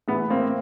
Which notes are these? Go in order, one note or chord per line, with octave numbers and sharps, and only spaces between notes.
A2 E3 B3
A#3 C4